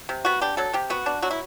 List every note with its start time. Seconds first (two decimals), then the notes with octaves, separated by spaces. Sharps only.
0.09 C3
0.25 B3 F#4
0.41 D4 G4
0.57 F#3 A4
0.73 C3 G4
0.90 B3 F#4
1.06 D4
1.22 F#3 F#4
1.31 E4